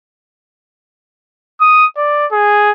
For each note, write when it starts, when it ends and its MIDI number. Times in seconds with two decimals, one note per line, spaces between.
1.61 1.87 87
1.97 2.26 74
2.31 2.71 68